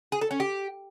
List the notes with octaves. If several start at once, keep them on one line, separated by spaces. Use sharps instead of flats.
G#4
A4
C#4
G4